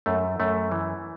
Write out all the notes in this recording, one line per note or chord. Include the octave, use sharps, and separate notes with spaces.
F#2 A3
F#2 A3
E3